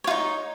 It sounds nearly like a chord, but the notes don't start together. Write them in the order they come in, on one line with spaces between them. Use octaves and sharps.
C#5 F4 D#4